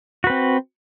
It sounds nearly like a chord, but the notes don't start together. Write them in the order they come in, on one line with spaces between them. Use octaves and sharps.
F#4 B4 C4